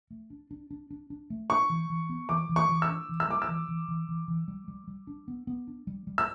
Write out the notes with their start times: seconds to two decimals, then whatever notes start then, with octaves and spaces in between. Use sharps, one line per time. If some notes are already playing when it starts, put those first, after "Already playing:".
0.11 A3
0.30 D4
0.51 D4
0.71 D4
0.91 D4
1.10 D4
1.30 A3
1.50 D4 C#6
1.70 E3
1.90 E3
2.09 B3
2.29 E3 D6
2.49 E3
2.56 C#6
2.69 E3
2.82 E6
2.89 D4
3.09 E3
3.20 E6
3.28 G3 D6
3.42 E6
3.48 E3
3.69 E3
3.88 E3
4.09 E3
4.28 E3
4.48 G3
4.68 G3
4.87 G3
5.07 D4
5.28 B3
5.47 B3
5.67 D4
5.87 G3
6.07 G3
6.18 E6